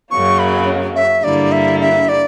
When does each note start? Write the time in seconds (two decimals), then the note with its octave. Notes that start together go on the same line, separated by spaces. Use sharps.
0.11 F#2 C#3 F#3 A#3 C#6
0.39 B5
0.95 E5
1.23 G2 D3 G3 A#3 E4 D5
1.52 E5
1.80 E5
2.09 D5